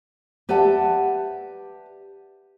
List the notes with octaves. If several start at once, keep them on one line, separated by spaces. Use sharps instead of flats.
G4 B4 D5 E5 F#5 A5